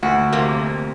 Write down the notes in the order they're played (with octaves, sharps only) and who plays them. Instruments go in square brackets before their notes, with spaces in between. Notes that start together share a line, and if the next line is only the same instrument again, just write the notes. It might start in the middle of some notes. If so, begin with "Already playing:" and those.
[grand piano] D2 [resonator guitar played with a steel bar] F#4
[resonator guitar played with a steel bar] F2 C3 A#3